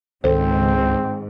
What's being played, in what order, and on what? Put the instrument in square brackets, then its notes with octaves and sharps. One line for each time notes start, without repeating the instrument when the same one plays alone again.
[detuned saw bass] C#2 [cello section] G#2 [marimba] D#3 A4 C5 [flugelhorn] C4